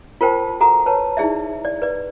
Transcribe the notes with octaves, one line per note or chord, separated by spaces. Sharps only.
F4 A#4 C5 G5 A5
F#4 A4 F#5 A#5 D#6
B4 C#5 A5
D#4 E4 G#4 D5 E5
D5
B4 D5